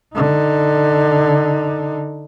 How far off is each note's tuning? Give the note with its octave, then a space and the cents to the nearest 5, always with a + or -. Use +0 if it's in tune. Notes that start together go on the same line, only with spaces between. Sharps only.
D3 +10 D#4 +0